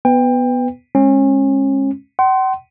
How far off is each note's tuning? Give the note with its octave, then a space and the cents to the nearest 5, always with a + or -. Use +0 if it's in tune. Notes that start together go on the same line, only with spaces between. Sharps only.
B3 +0 B4 +20 G5 +25
G#3 +0 C#4 -30
F#5 +45 C6 +0